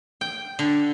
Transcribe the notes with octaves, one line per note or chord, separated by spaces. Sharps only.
G5
D3